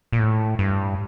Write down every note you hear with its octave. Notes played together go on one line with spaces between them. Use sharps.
A#2
A2
G2